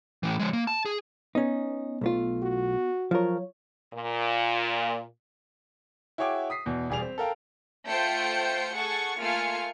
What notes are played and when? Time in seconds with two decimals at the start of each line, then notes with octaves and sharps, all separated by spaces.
0.23 A2 E3
0.39 F3 G#3
0.53 A#3
0.67 A5
0.86 G#4
1.35 B3 C#4 D#4
2.01 B1 A3 F4
2.42 F#4
3.11 F3 F#3 F4 A#4 C#5
3.94 A#2
6.18 E4 F#4 G#4 C#5 G5 D6
6.50 D#6 B6 C7
6.66 E2 B2
6.90 E1 G3 G#4 D5 F7
7.02 C4
7.18 A4 A#4 F5 G5
7.88 A3 F4 C5 G5 G6 C#7
8.76 G#4 A4 F#5 C#6
9.19 A3 A#3 F4 G#5 F6 C#7